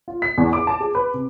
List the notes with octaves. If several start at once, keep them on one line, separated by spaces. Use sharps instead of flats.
F4
B6
E2
D6
A5
G#4
B4
C3